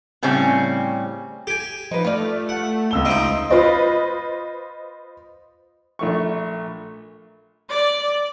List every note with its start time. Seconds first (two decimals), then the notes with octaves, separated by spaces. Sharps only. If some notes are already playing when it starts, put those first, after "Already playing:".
0.22 A2 C#3 G3 C4 C#4
1.47 G4 G#5
1.91 F3 D#4 B4
2.05 A3 F4 D5
2.49 F#5
2.91 C#2 E6 G7
3.05 C4 D#4 E4 D#5
3.50 F4 B4 C5 D#5
5.99 A#1 A3 C#6
7.69 D5